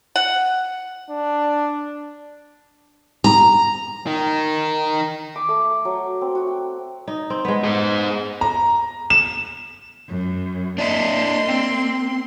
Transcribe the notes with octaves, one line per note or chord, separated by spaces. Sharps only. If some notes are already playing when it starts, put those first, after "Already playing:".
F#5
D4
A#5
D#3 D#4
D6
A3
F#3
C4
F#4
G5
D#4
C4
G#3 B3
G#4 C5
A#5
E7
F#2
A#3 D4 D#5 E5 C6
C4